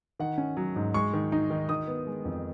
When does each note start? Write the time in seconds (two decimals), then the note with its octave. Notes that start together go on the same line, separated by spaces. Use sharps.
0.19 D#3 F#5
0.38 C#4
0.57 F#3
0.76 G#2
0.94 G#3 C#6
1.13 D#3
1.32 D#4
1.50 D#3
1.69 D#3 D#6
1.87 B3
2.07 G#3
2.25 F2